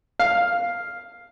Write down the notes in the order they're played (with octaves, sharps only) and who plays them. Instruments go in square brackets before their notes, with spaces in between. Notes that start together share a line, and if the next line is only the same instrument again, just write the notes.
[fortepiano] F5